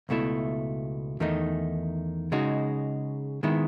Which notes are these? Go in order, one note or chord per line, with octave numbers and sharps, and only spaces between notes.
C#2 B2 A3 E4
E2 D#3 A3 D#4
C#3 G#3 D#4 F#4
D#3 G#3 B3 E4